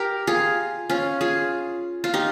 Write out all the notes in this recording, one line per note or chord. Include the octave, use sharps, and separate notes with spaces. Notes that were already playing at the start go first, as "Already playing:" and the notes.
Already playing: G4 A#4
F4 G#4
C#4 F4
F4 G#4
F4
D#4 G4